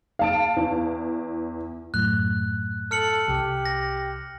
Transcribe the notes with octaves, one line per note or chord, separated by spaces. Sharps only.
F5 A5 D7
E2
F#2 A2 F#6
A4 F6 C#7 F#7
C2 G4
A#6